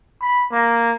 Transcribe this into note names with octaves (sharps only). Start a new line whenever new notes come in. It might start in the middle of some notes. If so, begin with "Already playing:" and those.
B5
A#3